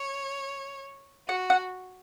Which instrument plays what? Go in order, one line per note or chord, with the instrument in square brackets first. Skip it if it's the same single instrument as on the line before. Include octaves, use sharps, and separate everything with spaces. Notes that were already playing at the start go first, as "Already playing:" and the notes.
Already playing: [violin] C#5
[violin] F#4 [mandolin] F#5
[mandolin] F#5